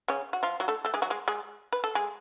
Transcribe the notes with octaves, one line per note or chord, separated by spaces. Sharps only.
C#3 C#4
F#4
F3 F4
F#3 F#4
A3 A4
A3 A4
G#3 G#4
F#3 F#4
G#3 G#4
G#3 G#4
B4
A4
G#3 G#4